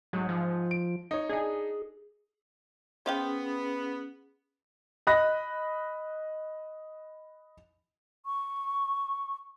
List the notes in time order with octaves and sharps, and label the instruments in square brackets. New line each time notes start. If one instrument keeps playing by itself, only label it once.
[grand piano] G#2 [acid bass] F#3
[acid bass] F3
[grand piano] D7
D#4 C#5
[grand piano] D4 D#4 [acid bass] G#4
[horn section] B3 [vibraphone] C#4 G#4 [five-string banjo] C5 F5 G5
[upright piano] D#5 B5 F#6 A#6
[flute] C#6